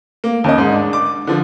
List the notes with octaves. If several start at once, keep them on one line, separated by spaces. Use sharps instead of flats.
A#3
D#2 C#4 D#5
G#2
D4
D6
D3 F3